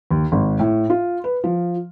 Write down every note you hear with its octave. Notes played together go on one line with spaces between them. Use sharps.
D#2
G#1
A2
F4
B4
F3